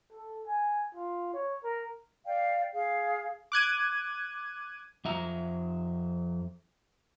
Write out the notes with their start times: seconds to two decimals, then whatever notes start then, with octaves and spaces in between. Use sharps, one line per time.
0.12 A4
0.47 G#5
0.95 F4
1.34 C#5
1.64 A#4
2.26 D5 F5 G5
2.73 G#4 F5
3.52 D6 F#6 G#6 D#7
5.05 F2 E5 A#5